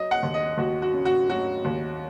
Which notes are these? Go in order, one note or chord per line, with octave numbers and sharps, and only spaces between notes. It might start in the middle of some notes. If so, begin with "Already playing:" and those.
Already playing: F#3 D#5
F#5
D#2
D#5
D#2 F#4
F#4
C#3
F#4
F#3 F#4
D#2